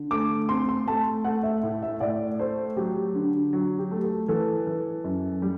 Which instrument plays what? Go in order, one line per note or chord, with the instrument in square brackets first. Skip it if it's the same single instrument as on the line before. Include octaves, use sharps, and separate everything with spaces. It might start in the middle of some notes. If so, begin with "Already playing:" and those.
Already playing: [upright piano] D3
[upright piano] A3 [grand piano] D6
[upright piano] C4 [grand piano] C6
[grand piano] C6
[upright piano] A3 [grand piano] A5
[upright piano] A3 [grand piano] F#5
[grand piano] E5
[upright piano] A2
[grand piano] E5
[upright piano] A2 [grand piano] D5
[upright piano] A3 [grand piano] C5
[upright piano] F#3 [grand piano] G4
[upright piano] D3
F#3
[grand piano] G4
[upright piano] A3
[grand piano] A4
[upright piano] E3 [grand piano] A4
[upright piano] E3
F#2
G3